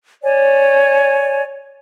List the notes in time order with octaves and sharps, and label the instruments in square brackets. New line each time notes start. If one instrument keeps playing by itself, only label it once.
[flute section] C#5 D5 G#5